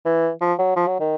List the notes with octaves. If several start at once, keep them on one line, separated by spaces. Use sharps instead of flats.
E3
F3
F#3
F3
F#3
D#3